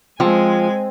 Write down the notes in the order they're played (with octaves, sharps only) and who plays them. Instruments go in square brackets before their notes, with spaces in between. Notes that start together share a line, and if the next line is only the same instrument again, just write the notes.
[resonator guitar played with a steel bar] F3 [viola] G#3 G#5 [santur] C4